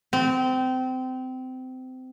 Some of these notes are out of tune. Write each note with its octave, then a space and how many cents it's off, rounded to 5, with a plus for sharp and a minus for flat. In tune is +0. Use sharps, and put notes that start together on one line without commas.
C4 -25